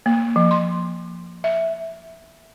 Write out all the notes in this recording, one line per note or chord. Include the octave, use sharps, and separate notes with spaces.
A#3
F3
C6
E5